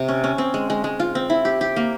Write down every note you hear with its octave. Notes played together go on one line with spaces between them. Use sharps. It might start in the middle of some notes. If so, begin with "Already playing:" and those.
Already playing: C3
C#4
C#4
C4
G#3
G#3
G#3
F4
C4
E4
G4
G4
A#3